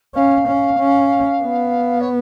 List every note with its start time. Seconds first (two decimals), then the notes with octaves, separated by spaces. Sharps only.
0.15 C#4 F5
0.48 C#4
0.79 C#4
1.43 B3
2.00 C#5